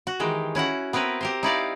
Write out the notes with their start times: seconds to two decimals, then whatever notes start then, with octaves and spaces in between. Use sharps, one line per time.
0.07 F#4
0.20 D#3 E3 G#3 G4
0.55 C#4 E4 F#4 F#5
0.93 B3 C4 E4 A#4 B4
1.21 G4 A#4 C5
1.43 D#4 E4 D5 F5